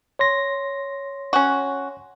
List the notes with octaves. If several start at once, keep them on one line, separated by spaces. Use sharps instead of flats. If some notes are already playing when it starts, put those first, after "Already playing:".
C#5 C6 A#6
C#4 F#4